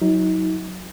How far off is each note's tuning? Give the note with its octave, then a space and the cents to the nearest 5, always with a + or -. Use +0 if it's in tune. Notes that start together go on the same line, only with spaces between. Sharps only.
F#3 +0 D#4 +40